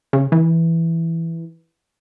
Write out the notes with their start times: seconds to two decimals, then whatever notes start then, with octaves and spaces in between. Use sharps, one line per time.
0.13 C#3
0.32 E3